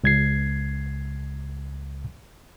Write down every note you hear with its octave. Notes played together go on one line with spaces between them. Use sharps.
C#2 G#6 C7